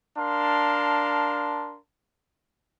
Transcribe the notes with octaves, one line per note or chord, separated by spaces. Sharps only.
D4 A#4 F5 A5 C6